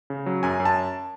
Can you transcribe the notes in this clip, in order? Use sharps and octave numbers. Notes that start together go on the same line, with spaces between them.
C#3
F#3
F#2 G#5
F#2
A5